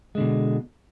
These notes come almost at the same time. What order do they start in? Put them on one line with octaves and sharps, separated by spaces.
G#3 D3 B2